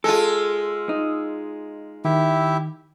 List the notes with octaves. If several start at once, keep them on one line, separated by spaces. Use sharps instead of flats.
G#3 F4 A4 E6
D#4
D#3 E4 G4 E5